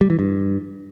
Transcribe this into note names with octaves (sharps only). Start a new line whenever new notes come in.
G3
E3
G2